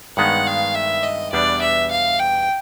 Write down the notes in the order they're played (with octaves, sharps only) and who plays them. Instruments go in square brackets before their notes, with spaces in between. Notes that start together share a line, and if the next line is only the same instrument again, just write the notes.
[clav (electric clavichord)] G2 D#3 G#3 B3 [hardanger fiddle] F#5
[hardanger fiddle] F5
E5
D#5
[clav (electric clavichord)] E2 B2 G3 B3 D4 [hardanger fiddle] D5
[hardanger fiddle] E5
F5
G5